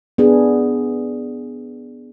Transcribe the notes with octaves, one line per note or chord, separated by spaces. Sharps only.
B3 D4 G#4